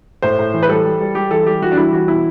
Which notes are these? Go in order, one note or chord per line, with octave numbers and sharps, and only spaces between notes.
A2 C5
A2
E3
B4
G3 A4
G3
G3
G3 G4
E3 A4
G3 G4
E3 F#4
D4
G3 E4
E3 F#4
B2 E4